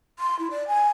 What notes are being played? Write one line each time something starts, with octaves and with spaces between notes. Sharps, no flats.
C6
E4
D5
G#5